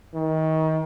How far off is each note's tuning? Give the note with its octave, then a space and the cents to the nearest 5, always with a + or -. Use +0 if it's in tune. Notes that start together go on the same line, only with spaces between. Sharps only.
D#3 +30